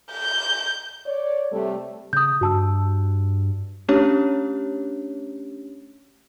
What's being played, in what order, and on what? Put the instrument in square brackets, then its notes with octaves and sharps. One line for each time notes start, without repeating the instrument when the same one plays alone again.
[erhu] G6
[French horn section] C#5 D5
C3 G3 A3
[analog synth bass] C#3 [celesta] D#6 G6
[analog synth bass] G2 [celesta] F#4 A5 E6
[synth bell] A3 C#4 D4 G4 C#5